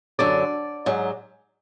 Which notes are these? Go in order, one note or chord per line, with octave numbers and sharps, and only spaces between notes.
F#2 D3 F#3 D5
G#2 F#3